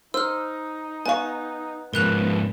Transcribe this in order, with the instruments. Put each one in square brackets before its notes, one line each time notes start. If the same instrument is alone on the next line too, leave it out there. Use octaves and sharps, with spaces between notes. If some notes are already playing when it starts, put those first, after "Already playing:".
[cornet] D#4 [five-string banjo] C5 [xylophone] E6 F6
[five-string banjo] B3 F5 [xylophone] G#5 C#6
[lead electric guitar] G#2 F3 [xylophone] A#4 F#6 F7 [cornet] B4